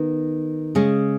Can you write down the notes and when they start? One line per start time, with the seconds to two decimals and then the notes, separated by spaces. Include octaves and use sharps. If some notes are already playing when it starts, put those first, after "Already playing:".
Already playing: D#3 B3
0.75 C#3 G#3 C#4